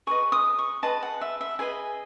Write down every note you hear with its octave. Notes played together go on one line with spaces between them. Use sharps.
G#4 B4 D#5 C#6
D#6
C#6
G#4 B4 D#5 A5
F#5
E5
E5
G#4 B4 D#5 G#5